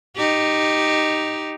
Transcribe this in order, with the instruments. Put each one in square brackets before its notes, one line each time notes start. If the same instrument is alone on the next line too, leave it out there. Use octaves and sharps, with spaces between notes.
[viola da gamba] D#4 G4